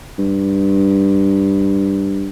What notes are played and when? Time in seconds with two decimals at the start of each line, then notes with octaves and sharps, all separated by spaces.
0.18 G2